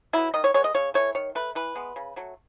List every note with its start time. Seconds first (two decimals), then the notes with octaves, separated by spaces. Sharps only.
0.13 F#3 B3 E4
0.34 D#3 D#5
0.44 C#5
0.54 G#3 B3 C#5
0.64 D#5
0.74 C#3 C#5
0.94 E3 A3 C#5
1.15 D#3 C#5
1.35 A3 B4
1.55 E3 B4
1.75 G#3 B3
1.96 C#3
2.16 F#3 A3